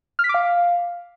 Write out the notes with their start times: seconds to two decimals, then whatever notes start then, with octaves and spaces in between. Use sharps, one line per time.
0.19 F6
0.24 B6
0.29 D6
0.34 F5